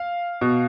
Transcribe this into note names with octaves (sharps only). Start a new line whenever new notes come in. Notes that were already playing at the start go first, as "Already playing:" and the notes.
Already playing: F5
B2